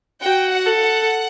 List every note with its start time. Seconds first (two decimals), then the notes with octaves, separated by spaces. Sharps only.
0.22 F#4 G5
0.52 F#5
0.66 A4
0.80 F#5